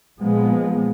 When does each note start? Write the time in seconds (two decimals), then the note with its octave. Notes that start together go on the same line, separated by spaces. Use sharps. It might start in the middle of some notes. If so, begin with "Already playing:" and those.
0.20 A#2 F3 G#3 B3